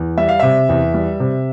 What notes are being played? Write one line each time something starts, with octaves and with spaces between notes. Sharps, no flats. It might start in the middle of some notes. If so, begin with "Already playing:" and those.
Already playing: E2
G3 E5
F5
C3 E5
E2
G3
C3